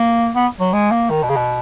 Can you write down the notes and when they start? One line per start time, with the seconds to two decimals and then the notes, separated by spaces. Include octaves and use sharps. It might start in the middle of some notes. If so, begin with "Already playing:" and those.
Already playing: A#3
0.35 B3
0.60 F#3
0.73 G#3
0.91 A#3
1.10 D#3
1.23 B2
1.29 C#3
1.36 B2